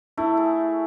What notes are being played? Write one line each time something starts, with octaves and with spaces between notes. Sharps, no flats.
A3 E4
G#4